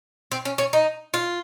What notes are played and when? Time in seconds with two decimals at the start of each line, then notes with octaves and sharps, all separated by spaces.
0.32 C4
0.45 C#4
0.58 C#4
0.73 D#4
1.14 F4